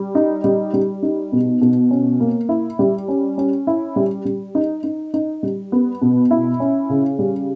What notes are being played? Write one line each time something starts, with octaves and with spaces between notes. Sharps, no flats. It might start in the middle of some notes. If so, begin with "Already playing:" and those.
Already playing: G3
D#4
G3
G3
D#4
B2
B2
C#4
A#3
E4
G3
C#4
C#4
E4
G3
G3
D#4
D#4
D#4
G3
B3
B2
E4
C#4
C#3
G3